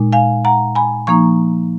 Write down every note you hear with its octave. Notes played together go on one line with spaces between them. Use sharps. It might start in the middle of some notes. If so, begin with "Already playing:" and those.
Already playing: A#2 G#3 D#4
F5 G#5
F#5 A#5
G#5 B5
F3 A#3 D#4 A#5 C#6